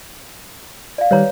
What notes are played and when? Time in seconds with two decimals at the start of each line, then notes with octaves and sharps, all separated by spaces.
0.98 D5 F5
1.11 D#3 G3 B4 C#5 A#5